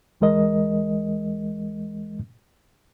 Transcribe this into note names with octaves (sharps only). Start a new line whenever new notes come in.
D2 E3 G#3 A#4 D#5